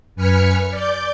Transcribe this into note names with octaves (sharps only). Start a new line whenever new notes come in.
F#2 B4 G#5 F6 B6 C#7
D5 D6 G6